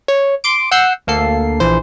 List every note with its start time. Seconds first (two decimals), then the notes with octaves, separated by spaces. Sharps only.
0.08 C#5
0.44 C6 D6 D7
0.71 F#5 E6 F#6 G6 C7
1.07 D2 A#3 A4 C7
1.60 A#1 E3 C5